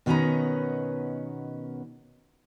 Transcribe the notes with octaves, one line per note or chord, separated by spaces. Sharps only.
B2 D#3 B3 C#4 B4 A#5